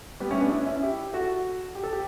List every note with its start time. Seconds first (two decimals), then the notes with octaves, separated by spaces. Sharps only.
0.20 G3 B3
0.31 A3 C#4
0.41 B3 D4
0.51 C#4 E4
0.66 C#4 E4
0.83 E4 G4
1.13 F#4 A4
1.75 G4
1.84 A4
1.93 G4